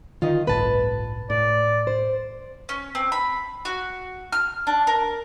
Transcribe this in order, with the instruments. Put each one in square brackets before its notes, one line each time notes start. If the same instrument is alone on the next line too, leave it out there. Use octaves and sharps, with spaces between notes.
[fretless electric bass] D3 D#3 [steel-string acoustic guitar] F4 D#5
[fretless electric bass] G1 C2 A2 [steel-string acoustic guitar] B4 A5
[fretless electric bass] A2 [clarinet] D5
[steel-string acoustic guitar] C5
[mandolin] C#4
C4
B5
F#4
F6
D4
A#4